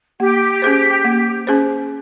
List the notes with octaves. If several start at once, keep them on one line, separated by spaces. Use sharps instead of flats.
A#3 G4
C#4 G#4 C5
A#3
C#4 G#4 C5